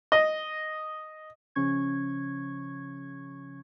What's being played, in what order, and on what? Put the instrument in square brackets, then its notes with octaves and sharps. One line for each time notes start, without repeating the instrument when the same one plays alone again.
[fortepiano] D#5
[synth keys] C#3 F3 C#4 C#6 G#6